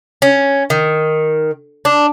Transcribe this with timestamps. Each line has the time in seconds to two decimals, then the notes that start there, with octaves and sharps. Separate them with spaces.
0.22 C#4
0.70 D#3
1.85 D4